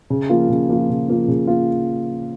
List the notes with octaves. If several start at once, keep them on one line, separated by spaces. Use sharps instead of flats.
C#3
F3 A#3 F4
C#3
F3 A#3 F4
C#3
F3 A#3 F4
C#3
A#3 F4